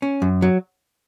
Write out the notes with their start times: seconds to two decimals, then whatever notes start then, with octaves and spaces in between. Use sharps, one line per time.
0.02 C#4
0.22 F#2
0.42 F#3